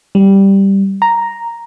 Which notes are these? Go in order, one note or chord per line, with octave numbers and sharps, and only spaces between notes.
G3
A#5